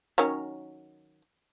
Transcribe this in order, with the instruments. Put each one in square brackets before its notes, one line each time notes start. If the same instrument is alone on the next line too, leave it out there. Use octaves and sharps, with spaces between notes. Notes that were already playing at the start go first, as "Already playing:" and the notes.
[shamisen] D#3 F#3 C#4